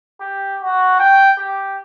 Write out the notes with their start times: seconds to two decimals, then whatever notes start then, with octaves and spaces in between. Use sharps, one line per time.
0.21 G4
0.63 F#4
1.00 G5
1.38 G4